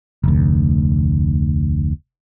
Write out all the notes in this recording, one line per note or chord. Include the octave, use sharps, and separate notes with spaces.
F1 D2